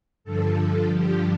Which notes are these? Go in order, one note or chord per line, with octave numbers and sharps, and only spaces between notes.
G2 D3 F3 A4
G4